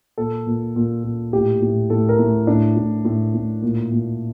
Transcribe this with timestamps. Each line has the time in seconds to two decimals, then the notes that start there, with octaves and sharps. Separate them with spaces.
0.18 A#2 A4
0.47 A#2
0.76 A#2
1.04 A#2
1.33 A2 G4
1.62 A2
1.90 A2 A4
2.09 A#4
2.19 A2
2.47 A2 D4
2.77 A2
3.05 A2
3.34 A2
3.62 A#2
3.92 A#2